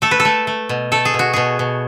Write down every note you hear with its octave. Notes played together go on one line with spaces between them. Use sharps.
A3 A4
B4
A4
A3
A3
B2
A3 A4
G#4
B2
F#4
B2 G#4
B2